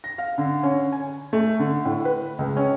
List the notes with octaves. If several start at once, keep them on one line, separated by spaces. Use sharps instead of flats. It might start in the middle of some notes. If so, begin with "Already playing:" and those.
A#6
F5
D3
C#4
G#5
A3
D3
A2
B4
C#2
C#4